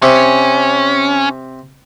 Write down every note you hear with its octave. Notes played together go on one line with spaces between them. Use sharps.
C3 C#4